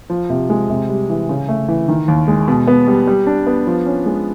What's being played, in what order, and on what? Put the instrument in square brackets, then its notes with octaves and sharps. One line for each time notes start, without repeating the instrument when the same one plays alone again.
[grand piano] F3
C3
G#3
C3
G3
E3
C#3
A3
E3
D#3
D#2
G#3
B2
B3
G3
G3
D4
B3
F3
C#4
G#3